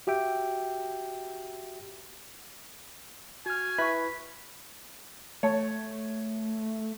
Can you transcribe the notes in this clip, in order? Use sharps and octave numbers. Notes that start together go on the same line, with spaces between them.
F#4 G4 E5 G5
F#4 G#5 F6
E4 B4 E5 B5 C#6 B6
A3 C#5 A5